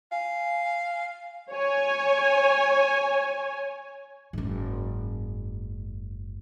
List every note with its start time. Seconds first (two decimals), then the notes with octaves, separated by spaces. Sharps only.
0.12 F5 G#5
1.50 C#5 G#5
4.33 F#1 G#2